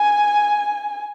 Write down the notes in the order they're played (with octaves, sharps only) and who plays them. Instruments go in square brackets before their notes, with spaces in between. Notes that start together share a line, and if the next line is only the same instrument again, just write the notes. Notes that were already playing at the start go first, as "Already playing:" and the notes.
Already playing: [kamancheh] G#5